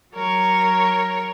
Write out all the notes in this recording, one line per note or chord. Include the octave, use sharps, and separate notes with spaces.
F#3 A#4 C#5 C#6